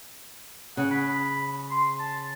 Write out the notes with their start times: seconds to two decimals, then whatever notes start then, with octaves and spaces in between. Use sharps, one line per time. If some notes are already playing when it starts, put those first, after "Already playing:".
0.77 C#3 F#5
0.91 B5
1.71 C6
1.99 A5